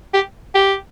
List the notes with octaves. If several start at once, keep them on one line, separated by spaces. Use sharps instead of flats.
G4
G4